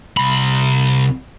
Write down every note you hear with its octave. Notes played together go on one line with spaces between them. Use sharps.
C2 B5